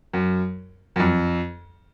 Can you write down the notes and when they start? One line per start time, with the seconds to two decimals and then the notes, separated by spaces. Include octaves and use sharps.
0.13 F#2
0.96 F#2
1.00 F2